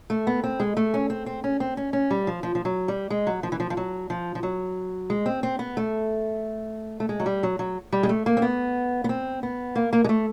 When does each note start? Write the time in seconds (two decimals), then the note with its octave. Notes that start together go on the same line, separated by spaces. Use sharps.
0.10 A3
0.27 B3
0.44 C4
0.60 G#3
0.77 A3
0.94 C#4
1.10 C4
1.26 C4
1.44 C#4
1.60 C4
1.77 C#4
1.93 C#4
2.11 G3
2.27 F3
2.43 F3
2.55 F3
2.65 F#3
2.88 G3
3.10 G#3
3.27 F#3
3.43 F3
3.52 E3
3.60 F3
3.70 F3
3.77 F#3
4.10 F3
4.35 F3
4.43 F#3
5.10 G#3
5.26 C4
5.43 C4
5.59 B3
5.77 A3
7.00 A3
7.09 G#3
7.20 F#3
7.26 G3
7.43 F#3
7.59 F#3
7.92 G3
8.03 G#3
8.09 A3
8.26 A#3
8.37 C4
8.42 B3
9.04 B3
9.09 C4
9.43 B3
9.75 A#3
9.93 A#3
10.04 G#3
10.09 A3